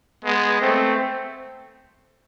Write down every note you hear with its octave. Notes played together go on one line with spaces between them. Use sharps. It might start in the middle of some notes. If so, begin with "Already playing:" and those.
G#3 B3
A3 C4